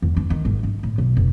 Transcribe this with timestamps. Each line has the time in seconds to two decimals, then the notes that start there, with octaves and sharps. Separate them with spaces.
0.02 E2
0.16 D4
0.30 D#3
0.45 G#1
0.63 D3
0.83 A2
0.98 B1
1.17 F1